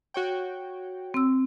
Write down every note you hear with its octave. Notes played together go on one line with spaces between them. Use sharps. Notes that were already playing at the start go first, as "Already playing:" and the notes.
F#4 C#5 G5
C4 E6